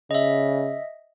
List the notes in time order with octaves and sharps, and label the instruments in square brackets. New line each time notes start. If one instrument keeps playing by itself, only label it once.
[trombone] C#3 [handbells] D#5 E5